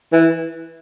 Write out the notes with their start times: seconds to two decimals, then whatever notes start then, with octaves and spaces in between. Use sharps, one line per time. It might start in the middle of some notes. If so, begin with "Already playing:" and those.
0.12 E3